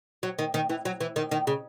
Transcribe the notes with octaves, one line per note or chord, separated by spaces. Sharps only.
F#3
D#3
D#3
E3
F#3
E3
D#3
D#3
C#3